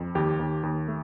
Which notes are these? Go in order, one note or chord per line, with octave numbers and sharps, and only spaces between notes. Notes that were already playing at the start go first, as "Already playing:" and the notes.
Already playing: F2
D#2 G4
D#2
D#2
A3